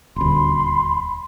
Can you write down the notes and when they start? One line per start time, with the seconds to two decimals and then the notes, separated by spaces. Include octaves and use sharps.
0.16 D#1 D2 B5 C6